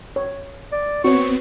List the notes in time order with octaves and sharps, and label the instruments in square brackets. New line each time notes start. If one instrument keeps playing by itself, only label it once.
[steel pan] C#5
[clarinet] D5
[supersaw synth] B3 C4 [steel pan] F#4 C#5 [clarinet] C#6